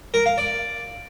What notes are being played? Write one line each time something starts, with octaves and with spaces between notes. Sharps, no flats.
A#4
F5
D5